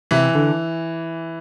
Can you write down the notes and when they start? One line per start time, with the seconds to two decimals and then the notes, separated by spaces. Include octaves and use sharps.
0.11 C3 E3
0.35 D3